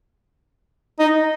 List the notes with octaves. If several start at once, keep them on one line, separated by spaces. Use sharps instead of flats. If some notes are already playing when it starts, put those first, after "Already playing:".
D#4